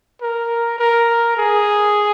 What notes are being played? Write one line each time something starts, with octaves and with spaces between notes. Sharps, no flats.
A#4
A#4
G#4